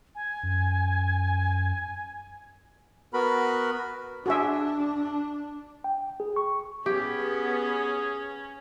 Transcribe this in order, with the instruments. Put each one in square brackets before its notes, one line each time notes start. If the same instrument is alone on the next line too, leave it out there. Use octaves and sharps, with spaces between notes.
[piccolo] G#5
[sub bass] F#2
[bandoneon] B3 F#4 A#4 B4 B5
[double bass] D4 [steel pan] F#4 G#4 E5
[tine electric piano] G5
G#4
C#6
[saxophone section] B3 [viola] C#4 [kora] G4 [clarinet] G#4